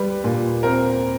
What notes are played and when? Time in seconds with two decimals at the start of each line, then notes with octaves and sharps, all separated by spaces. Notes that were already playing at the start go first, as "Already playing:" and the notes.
Already playing: G3 B4
0.24 A#2
0.63 C4 A#4